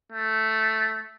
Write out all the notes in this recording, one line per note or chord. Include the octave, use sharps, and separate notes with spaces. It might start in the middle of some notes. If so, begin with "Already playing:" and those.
A3